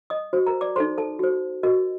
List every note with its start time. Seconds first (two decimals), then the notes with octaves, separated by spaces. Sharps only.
0.10 D#5 D#6
0.33 F#4 C5
0.47 A#4 A#5
0.61 D5 D6
0.76 D#4 A4 C5 C6
0.98 A4 A5
1.19 F#4 C5
1.63 F#4 A#4 D#5